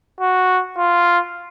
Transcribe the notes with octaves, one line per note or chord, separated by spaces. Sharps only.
F#4
F4